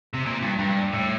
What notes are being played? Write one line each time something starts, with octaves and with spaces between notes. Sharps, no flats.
C3
A#2
G2
G2
A2